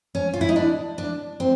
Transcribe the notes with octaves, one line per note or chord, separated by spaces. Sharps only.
C#4
F4
E4
D#4
D4
D4
C4